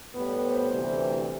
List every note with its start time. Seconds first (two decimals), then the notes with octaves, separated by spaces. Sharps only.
0.15 A2 G3 B3
0.43 C5
0.72 D2 C3 E3 G3